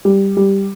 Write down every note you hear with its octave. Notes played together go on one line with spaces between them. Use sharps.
G3
G3